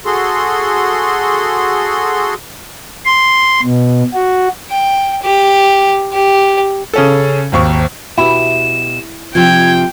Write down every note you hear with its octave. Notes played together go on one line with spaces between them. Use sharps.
F#4 G#4 A4 C6
C6
B2
F#4
G5
G4
G4
C#3 C#4 A4
G#1 D#2 C#6
B2 E4 F#4 G4 E7
C3 F3 F4 G5 G#6